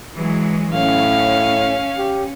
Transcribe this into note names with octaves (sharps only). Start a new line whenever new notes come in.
E3 F#3 G#3
A2 C#4 F5
G4